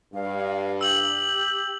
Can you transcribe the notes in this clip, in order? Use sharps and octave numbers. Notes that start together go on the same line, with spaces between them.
G2 F5
G4 E6 F#7